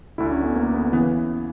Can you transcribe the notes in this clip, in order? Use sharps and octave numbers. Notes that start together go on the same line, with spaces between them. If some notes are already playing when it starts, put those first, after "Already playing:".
D2 D3 E4
C#4
B3
A#3
B3
C#3 E3 B3